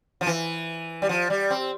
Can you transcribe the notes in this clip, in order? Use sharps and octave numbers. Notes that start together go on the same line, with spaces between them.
F3
E3
G3
F3
G3
C4